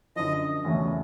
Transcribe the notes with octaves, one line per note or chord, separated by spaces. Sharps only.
F#2 D3 F3 D#5
E2 C#3 F#3 A3 C#4